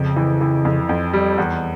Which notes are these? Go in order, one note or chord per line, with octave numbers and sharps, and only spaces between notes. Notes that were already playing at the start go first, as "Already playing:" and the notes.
Already playing: F2 C#3
E3
E3
F2
F2
G3
E2